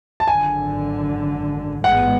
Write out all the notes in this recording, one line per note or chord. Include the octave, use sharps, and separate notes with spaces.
A5
G#1 F#2 D3 G#5
A1 G#2 G#3 B3 F#5